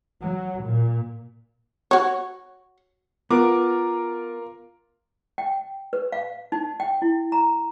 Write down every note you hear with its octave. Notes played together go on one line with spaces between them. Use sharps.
F#3
A#2
F#4 C#5
B3 F4 A#4 D6
G5
B4
F5
D#4
G5
E4
A#5